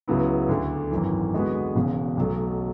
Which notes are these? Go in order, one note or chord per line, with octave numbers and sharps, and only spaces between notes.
C#2 C#3 F#3 B3 E4
D2 D3 A3
G#1 F#2 E3
D3 G#3 B3 F#4 B4
E1 E2 C#3
B1 B2 F#3 A3